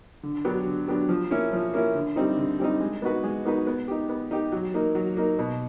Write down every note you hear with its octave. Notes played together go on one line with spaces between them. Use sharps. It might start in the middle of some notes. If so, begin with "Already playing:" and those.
D3
F#3 B3 D4 G4
D3
F#3 B3 D4 G4
F3
A#3 C#4 E4
F3
A#3 C#4 E4
D3
G3 C4 D#4
D3
G3 C4 D#4
G#3
B3 D#4 F#4 B4
G#3
B3 D#4 F#4 B4
B3
D#4 G4
B3
D#4 G4
F#3
A#3 D#4
F#3
A#3 D#4
B2